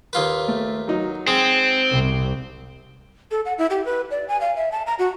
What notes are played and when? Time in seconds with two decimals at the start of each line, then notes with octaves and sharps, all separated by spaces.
0.13 D#2 F4 B4
0.48 A3
0.88 F#3 D#4
1.28 G#3 C4
1.91 C2 C3
3.31 A4
3.45 F#5
3.58 E4
3.70 G4
3.85 B4
4.11 D5
4.28 G#5
4.41 F5
4.56 E5
4.72 A5
4.87 A#5
4.99 F#4